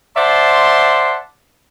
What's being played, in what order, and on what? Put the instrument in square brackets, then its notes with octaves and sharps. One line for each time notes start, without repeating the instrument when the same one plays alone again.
[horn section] C5 D5 E5 F#5 A5 C6